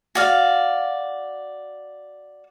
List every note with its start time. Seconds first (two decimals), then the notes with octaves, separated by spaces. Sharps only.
0.15 F#4 D5 F5